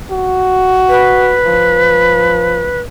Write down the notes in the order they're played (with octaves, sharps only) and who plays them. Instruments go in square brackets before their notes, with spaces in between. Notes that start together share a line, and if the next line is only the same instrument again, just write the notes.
[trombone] F#4
[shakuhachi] B4
[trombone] F3